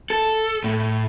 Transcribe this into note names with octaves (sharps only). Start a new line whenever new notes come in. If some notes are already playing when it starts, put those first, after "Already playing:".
A4
A2